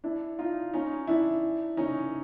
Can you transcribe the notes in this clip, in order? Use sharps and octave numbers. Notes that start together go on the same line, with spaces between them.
D4 E4
D#4 F4
C#4 D#4
D4 E4
C#4 D#4